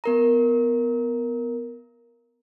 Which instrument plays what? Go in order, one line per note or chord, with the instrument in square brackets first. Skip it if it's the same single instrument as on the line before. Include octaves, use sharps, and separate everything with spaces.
[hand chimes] B3 A#4 A#5